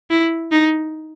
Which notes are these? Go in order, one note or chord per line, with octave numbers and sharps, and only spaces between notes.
E4
D#4